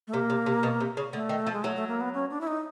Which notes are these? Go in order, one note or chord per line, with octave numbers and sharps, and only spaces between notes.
A3
C3 A#3
C3
C3
B2
C3
C#3
D3 A3
D#3
F3
G#3
F#3 A3
A3
A#3
B3
C#4
D4
E4
D#4